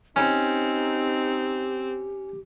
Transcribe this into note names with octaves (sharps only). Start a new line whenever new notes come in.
C4 C#4 D#4 G4